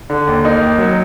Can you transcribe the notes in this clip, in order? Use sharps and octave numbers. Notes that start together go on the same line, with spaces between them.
D3
D#2
A#3 D#4
D#2
F#3